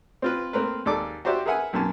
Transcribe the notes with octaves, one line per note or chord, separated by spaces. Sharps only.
C4 F4 B4
A3 A#3 C4 A#4 B4
D#2 G#3 A4 D5 A5 D6
F#4 G4 C5 D5 E5
G#4 A#4 B4 E5 F#5 G#5
B1 F#2 A#3 G#5 A5